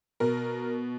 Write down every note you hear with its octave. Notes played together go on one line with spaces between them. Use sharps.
B2 A#4